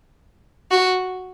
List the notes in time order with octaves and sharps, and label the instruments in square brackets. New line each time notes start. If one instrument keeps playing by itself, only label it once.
[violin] F#4